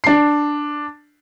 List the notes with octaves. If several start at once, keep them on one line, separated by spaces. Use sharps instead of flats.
D4 C7